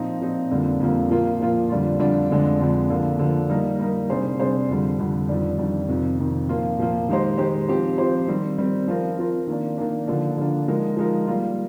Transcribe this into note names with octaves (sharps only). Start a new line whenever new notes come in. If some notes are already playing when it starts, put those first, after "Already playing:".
Already playing: A#2 F3 C4 D#4
A#2 F3 C4 D#4
F2 D3 G3 A#3
F2 D3 G3 A#3
A#2 F3 A#3 F4
A#2 F3 A#3 F4
F2 D3 G3 D4 F4
F2 D3 G3 D4 F4
F2 D3 G#3 D4
F2 D3 G#3 D4
D3 F3 A#3
D3 F3 A#3
G3 A#3 D#4 A#4
G3 A#3 D#4 A#4
C3 G3 D4 G#4 C5
C3 G3 D4 G#4 C5
F2 D3 G3
F2 D3 G3
F2 D#3 G3 D4
F2 D#3 G3 D4
F2 C3 D#3
F2 C3 D#3
A#2 F3 A#3 F4
A#2 F3 A#3 F4
D#3 G#3 D#4 G4 C5
D#3 G#3 D#4 G4 C5
F3 C4 G4 C5
F3 C4 G4 C5
D#3 G3 C4
D#3 G3 C4
F3 C4 F4 A#4
F3 C4 F4 A#4
D#3 A#3 D4
D#3 A#3 D4
D3 F3 A#3 D4
D3 F3 A#3 D4
F3 G#3 D#4 A#4
F3 G#3 D#4 A#4
G3 A#3 F4